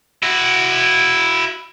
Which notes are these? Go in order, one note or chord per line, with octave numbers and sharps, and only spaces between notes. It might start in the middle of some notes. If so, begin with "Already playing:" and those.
E4 F#4